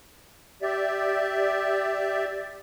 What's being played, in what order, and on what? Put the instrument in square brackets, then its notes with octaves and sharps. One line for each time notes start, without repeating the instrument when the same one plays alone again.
[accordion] G4 D5 E5